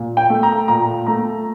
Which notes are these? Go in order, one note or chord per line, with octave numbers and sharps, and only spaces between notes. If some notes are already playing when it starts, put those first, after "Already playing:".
Already playing: A#2
G5
A3
A#5
A#2 A#5
A3 A#5